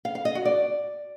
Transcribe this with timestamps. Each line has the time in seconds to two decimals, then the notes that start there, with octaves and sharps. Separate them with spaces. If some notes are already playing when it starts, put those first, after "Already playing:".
0.05 F5
0.15 F5
0.25 D#5
0.35 F#4
0.45 D5